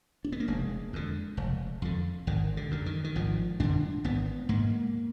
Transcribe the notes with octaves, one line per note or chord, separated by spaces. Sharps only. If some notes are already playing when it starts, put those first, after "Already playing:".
D4
B3
A#3
F1 G#3
F2 D3
F1
F2 D3
G#1 D#3
D3
F#2 D3
D#3
D#3
G#1 F3
F#2 D3 D4
G#1 B3
G#2 A#3